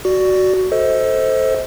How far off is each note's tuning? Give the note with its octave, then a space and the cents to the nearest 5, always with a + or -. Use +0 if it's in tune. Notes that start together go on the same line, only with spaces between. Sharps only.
F#4 +10 D5 +0
A4 +0 C5 +0 D#5 +35